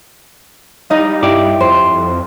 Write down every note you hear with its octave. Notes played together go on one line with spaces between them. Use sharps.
G3 D#4 D#5 F5
G2 E4 G4 D5
F2 C5